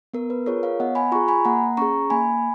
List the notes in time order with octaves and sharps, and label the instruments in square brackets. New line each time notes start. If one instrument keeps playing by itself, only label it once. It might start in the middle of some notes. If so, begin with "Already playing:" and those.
[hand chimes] B3 A#4
B4
F4 G#4 A#4 C#5
C#5 F5
B3 D#5 F#5
G#5 B5
F4 G#4 A#5 C#6
G#5 B5
A#3 F#5 A#5
C#4 G#4 A#5 C#6
A#3 G#5 B5